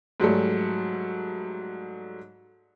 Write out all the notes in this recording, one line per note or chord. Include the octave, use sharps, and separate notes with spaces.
G#2 F#3 G3 A3